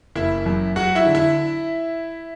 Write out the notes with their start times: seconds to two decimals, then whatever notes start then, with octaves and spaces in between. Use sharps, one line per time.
0.16 F#1 E4 E5
0.46 F#2
0.76 F#3 F#4 F#5
0.95 E4 E5
1.06 D3
1.15 E4 E5